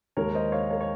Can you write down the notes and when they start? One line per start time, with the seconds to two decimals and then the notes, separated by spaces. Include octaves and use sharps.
0.17 D#2 D#3 G#3 A#4 C#5
0.35 C5 D#5
0.52 C#5 F5
0.71 A#4 C#5
0.81 C#5